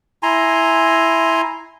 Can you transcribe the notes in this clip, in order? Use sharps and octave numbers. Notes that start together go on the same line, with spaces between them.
E4 G#5 A#5 C6